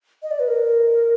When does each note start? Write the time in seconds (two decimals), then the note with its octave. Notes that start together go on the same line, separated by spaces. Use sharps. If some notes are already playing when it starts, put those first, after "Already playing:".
0.23 D#5
0.31 D5
0.40 B4
0.48 A#4